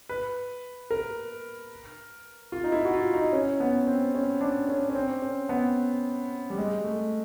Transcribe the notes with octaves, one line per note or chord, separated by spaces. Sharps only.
B4
A#4
F4
D#4
E4
F#4
F4
D#4
C#4
B3
C4
C#4
D4
C#4
C#4
C4
C#4
B3
G3
G#3
A3